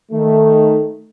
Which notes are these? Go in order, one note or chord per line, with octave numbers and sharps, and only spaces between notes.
D#3 A3